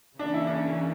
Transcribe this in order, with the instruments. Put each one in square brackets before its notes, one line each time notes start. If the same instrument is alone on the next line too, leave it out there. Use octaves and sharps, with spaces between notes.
[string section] C#3 E3 A#3 C#4 [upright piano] D4
[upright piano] E4
D4